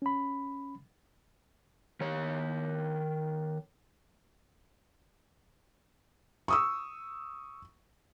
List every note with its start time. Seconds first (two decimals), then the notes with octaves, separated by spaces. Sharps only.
0.02 C#4 B5
2.01 D#3 C#5
6.48 C#6 D#6 E6